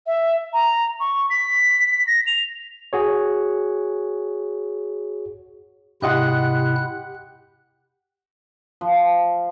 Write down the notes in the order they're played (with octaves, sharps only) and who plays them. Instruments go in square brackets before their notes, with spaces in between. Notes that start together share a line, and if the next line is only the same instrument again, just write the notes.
[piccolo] E5
A#5
C#6
B6
A#6
F7
[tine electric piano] F#4 G#4 C#5
[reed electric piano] G#2 D#5 C6 [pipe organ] C3 E4 F#6 [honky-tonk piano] G4 F#5
[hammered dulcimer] F3